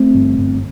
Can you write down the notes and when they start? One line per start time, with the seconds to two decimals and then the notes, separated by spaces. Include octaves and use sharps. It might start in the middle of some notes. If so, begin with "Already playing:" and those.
Already playing: A3 C4
0.14 G1
0.38 G1